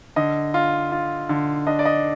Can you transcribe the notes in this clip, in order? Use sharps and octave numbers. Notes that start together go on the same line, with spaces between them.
D3 D#5
F4
F4
D3
D4 D#5
D5
D#5